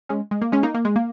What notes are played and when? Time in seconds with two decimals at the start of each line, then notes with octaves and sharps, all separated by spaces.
0.09 G#3 C#4
0.31 G#3
0.42 A#3
0.52 G#3 C#4
0.63 A#3 D#4
0.74 A#3
0.85 G#3
0.96 A#3